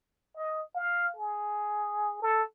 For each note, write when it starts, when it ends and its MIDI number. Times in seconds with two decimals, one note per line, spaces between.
0.35 0.61 75
0.75 1.11 77
1.16 2.18 68
2.22 2.42 69